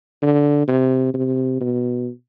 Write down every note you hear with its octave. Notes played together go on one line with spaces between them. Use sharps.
D3
C3
C3
B2